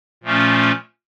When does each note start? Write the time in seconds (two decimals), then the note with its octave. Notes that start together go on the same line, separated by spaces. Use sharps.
0.23 A#2 F3 A3 C#4